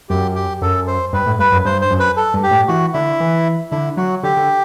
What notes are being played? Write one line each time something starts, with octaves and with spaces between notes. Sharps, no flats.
F#2 G4
G4
F#2 A4
C5
G2 B4
A2
G2 B4
F#2
G2 C5
C5
F#2
B4
A4
G2
G4
A2
E3 F#4
D3 E4
E3
D3 E4
F#3 F#4
D3 G4
D3